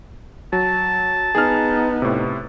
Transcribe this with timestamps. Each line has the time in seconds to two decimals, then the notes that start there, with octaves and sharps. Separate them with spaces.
0.53 F#3 A5
1.35 B3 D#4 G#4 F6
2.02 A2 C3